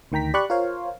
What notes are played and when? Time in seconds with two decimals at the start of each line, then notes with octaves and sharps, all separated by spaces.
0.12 D2 D#3 G5 A#5 B6
0.34 G4 D5 B5 C#6 F#6
0.50 F4 A#4 C5 C#5 F5